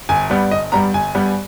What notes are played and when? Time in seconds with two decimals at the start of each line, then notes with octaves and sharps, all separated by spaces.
0.09 G1 G#5
0.30 G2 G3 B3
0.51 G1 D#5
0.72 G2 G3 B3 A#5
0.94 G1 G#5
1.15 G2 G3 B3